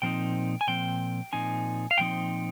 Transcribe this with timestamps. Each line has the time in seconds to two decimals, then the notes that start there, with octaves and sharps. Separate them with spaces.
0.02 A#2 F3 C4 D#4 G5
0.61 G#5
0.67 A#2 F3 C4 G5
1.33 A#2 F3 C4 D#4 G#5
1.91 F5
1.98 A#2 F3 C4 D#4 G5